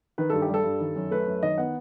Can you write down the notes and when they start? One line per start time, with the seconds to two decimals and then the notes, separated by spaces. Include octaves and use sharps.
0.18 D#3 B4
0.30 G2 A4
0.42 G4
0.49 G3 A4
0.64 G2
0.80 D#3
0.96 F#2
1.11 A3 B4
1.27 F#2
1.42 D#3 D#5
1.58 B3 F#5